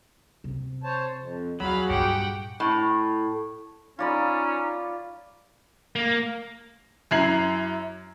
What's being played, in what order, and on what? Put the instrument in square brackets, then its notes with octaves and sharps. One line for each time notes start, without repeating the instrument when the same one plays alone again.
[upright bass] C3
[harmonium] C5 C#5 A5
F2
[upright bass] E2 [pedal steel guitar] F#3 [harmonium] F#4 G#4 [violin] F5 B5
[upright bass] G2 A#2 [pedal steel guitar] G4 [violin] F#5 G5
[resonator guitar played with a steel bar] A2
[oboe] C#4 [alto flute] D#4 [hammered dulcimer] F4 D5 B5
[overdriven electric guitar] A#3
[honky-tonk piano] F#2 E4 A#5 G#6 C7 F#7